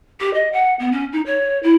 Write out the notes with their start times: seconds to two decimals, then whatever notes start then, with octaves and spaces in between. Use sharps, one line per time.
0.20 G4
0.34 D#5
0.53 F#5
0.79 B3
0.92 C#4
1.12 D#4
1.26 C#5
1.63 E4